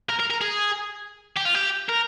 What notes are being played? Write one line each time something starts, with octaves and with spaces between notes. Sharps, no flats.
A#4
A#4
A#4
G#4
G4
F4
G4
A#4